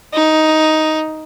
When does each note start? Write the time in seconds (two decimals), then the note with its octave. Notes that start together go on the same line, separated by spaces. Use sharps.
0.13 D#4